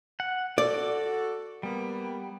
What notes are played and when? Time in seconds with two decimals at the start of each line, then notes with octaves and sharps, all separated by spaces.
0.20 F#5
0.58 F#4 A4 D5 D6
1.63 G3 A#3 B3